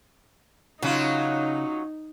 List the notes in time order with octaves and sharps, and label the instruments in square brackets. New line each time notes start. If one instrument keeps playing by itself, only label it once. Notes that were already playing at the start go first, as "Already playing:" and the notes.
[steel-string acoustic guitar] C#3 [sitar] F#3 C#4 F4 [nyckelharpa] D#4